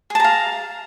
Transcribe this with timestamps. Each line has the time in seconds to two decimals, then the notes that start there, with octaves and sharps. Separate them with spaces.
0.10 G#4
0.15 A5
0.20 A#5
0.24 F5